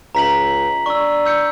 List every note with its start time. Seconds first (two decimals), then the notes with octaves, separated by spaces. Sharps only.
0.15 C#2 A#5 B6 F#7
0.86 D4 C#6 E6
1.25 E6 G6 C#7